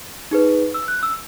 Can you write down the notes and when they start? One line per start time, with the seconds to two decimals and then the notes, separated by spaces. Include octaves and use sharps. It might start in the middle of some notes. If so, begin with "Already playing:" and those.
0.31 D#4 G#4 B4
0.74 E6
0.88 F#6
1.03 E6